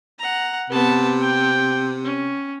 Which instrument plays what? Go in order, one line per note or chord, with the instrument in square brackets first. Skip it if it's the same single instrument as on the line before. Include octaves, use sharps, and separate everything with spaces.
[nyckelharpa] F#5 A#5
[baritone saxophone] C3 [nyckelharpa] B3 A5
[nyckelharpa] G5
C#4